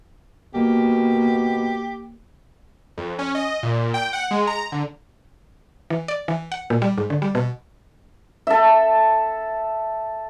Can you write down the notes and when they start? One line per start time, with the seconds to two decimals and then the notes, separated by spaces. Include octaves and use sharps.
0.54 B2 A#3 G4
2.98 F2
3.19 C#4
3.35 D#5
3.63 A#2
3.94 G5
4.13 F#5
4.31 G#3
4.47 A#5
4.72 D3
5.90 E3
6.08 D5
6.28 E3
6.52 F#5
6.70 A#2
6.82 G3
6.98 G#2
7.10 D3
7.22 G3
7.35 B2
8.47 A4 E5